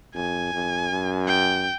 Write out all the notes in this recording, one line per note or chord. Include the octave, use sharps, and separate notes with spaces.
F2 G#5
F2
F#2
G5